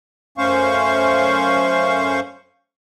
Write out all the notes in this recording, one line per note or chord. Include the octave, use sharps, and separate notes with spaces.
F#2 A3 C#4 C5 F5 C#6